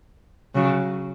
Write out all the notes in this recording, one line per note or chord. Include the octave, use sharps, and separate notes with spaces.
C#3 F#3